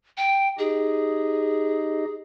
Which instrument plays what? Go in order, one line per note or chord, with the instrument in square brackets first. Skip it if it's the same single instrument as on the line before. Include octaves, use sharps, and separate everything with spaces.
[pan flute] G5
[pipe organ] D#4 G4 D#5 [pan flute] G#4